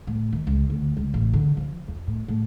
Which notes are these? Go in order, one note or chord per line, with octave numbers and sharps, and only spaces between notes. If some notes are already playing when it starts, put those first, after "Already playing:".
A2
D#3
C#2
D2
C#2
A1
D3
F3
F2
A2
A2